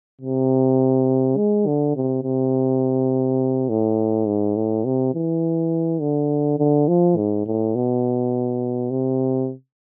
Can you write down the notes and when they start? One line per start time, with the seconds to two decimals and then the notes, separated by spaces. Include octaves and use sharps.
0.21 C3
1.37 G#3
1.67 D3
1.95 C3
2.23 C3
3.69 A2
4.27 G#2
4.56 A2
4.85 C3
5.14 E3
6.01 D3
6.59 D3
6.88 F3
7.17 G#2
7.47 A2
7.75 B2
8.91 C3